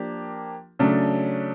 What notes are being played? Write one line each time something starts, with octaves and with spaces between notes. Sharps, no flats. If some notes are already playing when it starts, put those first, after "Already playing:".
Already playing: F3 A#3 D4 G4
C#3 F#3 A3 D4